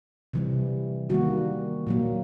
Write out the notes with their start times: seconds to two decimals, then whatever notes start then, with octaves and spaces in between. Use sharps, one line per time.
0.33 C3 E3 G3
1.09 D#3 G3 A#3 F#4
1.87 A#2 F#3 A#3